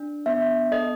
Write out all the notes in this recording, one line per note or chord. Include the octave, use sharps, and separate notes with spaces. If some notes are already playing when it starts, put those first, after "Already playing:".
Already playing: D4
B3 E5
A4 D#5